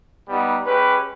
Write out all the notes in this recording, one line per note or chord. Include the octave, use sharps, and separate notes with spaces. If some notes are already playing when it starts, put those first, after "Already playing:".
G3 B3 D#4
G#3 C#4 G4 B4